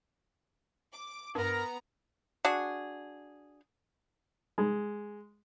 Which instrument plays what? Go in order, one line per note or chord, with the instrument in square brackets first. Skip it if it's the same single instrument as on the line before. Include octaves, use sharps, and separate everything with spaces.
[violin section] D6
[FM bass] G2 [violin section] B3 A#5 [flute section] A#4
[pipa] D4 F#4 G#4
[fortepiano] G#3